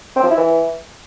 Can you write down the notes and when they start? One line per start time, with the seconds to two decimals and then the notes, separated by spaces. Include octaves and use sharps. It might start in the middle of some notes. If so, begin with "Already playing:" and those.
0.16 C4
0.23 F3
0.30 E4
0.37 E3